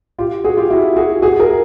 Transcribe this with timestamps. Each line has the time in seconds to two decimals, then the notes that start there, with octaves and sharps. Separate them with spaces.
0.19 F4 G4
0.44 F#4 G#4
0.57 F4 G4
0.70 E4 F#4
0.96 F#4 G#4
1.22 F#4 G#4
1.39 G#4 A#4